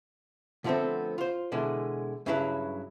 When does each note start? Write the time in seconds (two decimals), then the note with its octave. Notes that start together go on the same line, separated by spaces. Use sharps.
0.64 D3 F3 G3 A3 B3 C4
1.18 F4 C5
1.52 B2 D3 E3 G#3
2.26 G2 C#3 F#3 E4 A4 B4